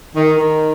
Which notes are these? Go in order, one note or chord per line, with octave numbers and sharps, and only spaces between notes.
D#3
D#3